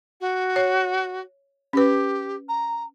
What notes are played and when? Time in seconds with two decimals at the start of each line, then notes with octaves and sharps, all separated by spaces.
0.20 F#4
0.56 C#5
1.73 C#4 G4 B4
2.48 A#5